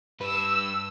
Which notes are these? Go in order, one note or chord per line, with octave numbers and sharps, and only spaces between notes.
G2 B4 E6